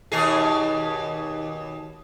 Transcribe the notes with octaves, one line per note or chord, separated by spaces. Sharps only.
D#2 B2 G#4